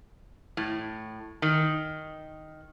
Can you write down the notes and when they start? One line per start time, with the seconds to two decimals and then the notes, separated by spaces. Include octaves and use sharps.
0.57 A2
1.42 D#3